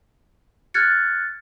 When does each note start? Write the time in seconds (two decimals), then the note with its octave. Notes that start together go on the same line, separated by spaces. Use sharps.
0.74 F6 F#6 G#6 A6 C#7